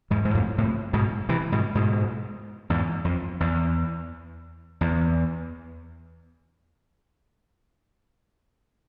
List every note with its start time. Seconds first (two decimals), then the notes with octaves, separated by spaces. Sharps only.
0.10 E2 G#2
0.25 G#2
0.34 F2 A2
0.58 A2 C3
0.93 G#2 B2
1.29 C3 E3
1.52 G#2 B2
1.75 G#2 B2
2.70 E2 G#2
3.05 F2
3.40 E2
4.81 E2